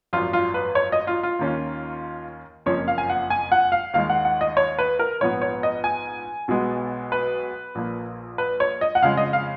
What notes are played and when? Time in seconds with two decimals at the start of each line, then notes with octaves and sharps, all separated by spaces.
0.13 G#1 F#2 F3 F4
0.33 F4
0.54 B4
0.75 C#5
0.92 D#5
1.07 F4
1.23 F4
1.39 D#2 D#3 A#3 C#4
2.66 F#1 F2 F3 A#3 C#4 C#5
2.88 F5
2.98 G#5
3.10 F#5
3.30 G#5
3.52 F#5
3.72 F5
3.93 D#2 D#3 G#3 F5
4.09 F#5
4.25 F#5
4.41 D#5
4.57 C#5
4.79 B4
4.99 A#4
5.21 A#1 G#2 F3 B3 C#5
5.42 C#5
5.63 D#5
5.84 G#5
6.48 B1 B2 G#3 B3
7.12 B4
7.75 A#1 A#2 F3 A#3
8.38 B4
8.60 C#5
8.81 D#5
8.95 F#5
9.02 F2 C#3 G#3 F5
9.17 D#5
9.33 F5